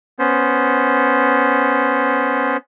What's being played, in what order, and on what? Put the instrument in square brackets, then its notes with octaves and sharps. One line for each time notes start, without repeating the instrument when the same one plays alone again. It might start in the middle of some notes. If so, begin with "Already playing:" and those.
[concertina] B3 C#4 C5